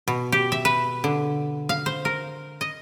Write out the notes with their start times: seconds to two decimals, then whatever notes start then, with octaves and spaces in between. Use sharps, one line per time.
0.08 B2
0.32 G4
0.52 E5
0.65 B4
1.04 D3
1.69 F5
1.86 C5
2.05 A#4
2.61 D#5